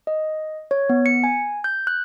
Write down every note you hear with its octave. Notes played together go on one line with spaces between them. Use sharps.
D#5
C#5
B3
C#7
G#5
G6
F#6